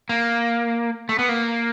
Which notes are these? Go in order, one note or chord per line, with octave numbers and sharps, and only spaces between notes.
A#3
A3
B3
A#3